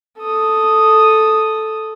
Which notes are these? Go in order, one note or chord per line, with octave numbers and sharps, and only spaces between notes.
A4 D#6